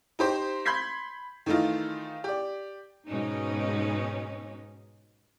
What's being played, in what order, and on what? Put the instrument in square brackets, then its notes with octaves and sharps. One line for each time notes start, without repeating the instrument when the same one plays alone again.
[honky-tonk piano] D#4 G4 C5
B5 C6 G6 G#6 B6 C7
D#3 E3 A3 D#4 F4
G4 D5
[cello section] G#2 B2 C#4 D#4